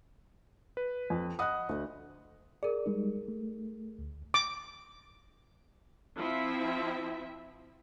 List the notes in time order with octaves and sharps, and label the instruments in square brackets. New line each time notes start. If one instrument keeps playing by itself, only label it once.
[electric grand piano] B4
[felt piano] F2
[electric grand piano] D#5 F#5 B5 [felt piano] D#6 F#6
[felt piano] D2
[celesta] G#4 A#4 [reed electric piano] D5
[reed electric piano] G3 G#3 D#4
A3
D2
[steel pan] D6
[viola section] F3 C4 E4 E5